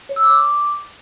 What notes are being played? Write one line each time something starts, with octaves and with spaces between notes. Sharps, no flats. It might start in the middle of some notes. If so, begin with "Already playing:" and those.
C#5
E6
D6